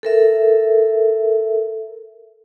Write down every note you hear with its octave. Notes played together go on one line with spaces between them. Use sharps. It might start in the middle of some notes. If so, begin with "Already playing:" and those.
A4 A#4 E5